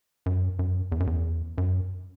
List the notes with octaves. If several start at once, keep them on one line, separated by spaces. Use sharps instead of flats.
F#2
F#2
E2
F#2
E2
F#2